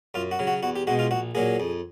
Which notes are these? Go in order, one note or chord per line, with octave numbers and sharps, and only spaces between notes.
F#2 F4
F#4
C#3 F#3
F#4
E2 F#4
G4
B2 G#3 F#4
F4
A#1 F#4
A#2 F#3 A#3 G#4
F2